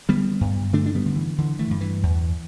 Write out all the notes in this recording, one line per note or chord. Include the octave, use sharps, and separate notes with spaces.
D3 G3 B3
G2
D3 A3 D4
D4
G3 B3
D3
E3
D3 E3
E3 A3
G2
E3
E2